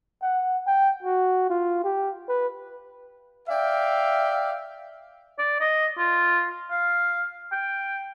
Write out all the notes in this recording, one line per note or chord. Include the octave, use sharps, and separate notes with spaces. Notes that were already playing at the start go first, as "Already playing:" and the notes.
F#5
G5
F#4
F4
G4
B4
D5 E5 F5 G5
D5
D#5
F4
F5
G5